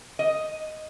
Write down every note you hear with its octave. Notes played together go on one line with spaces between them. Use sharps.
D#5